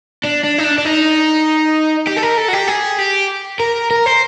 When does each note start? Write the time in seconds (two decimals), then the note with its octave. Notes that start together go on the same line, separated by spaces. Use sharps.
0.24 D4
0.44 D4
0.58 D#4
0.64 D4
0.78 D4
0.85 D#4
2.07 G4
2.16 A4
2.22 A#4
2.37 A4
2.48 F#4
2.53 G4
2.68 G#4
2.99 G4
3.60 A#4
3.91 A#4
4.06 C5